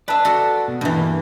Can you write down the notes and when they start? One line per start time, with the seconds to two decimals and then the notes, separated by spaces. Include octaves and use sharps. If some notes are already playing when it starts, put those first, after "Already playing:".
0.08 B4 D5 E5 A5
0.25 F#4 A4
0.68 B2
0.81 G2 E3 A#3